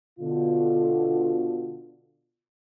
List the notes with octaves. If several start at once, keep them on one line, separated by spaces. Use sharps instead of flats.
B2 D3 F4